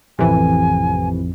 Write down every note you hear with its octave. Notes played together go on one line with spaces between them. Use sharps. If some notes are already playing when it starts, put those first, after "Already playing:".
A1 F2 C3 E3 G#5